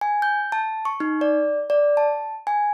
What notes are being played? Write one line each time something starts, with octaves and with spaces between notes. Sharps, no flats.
G#5
G6
A5
C#6
D#4
D5
D5
A5
G#5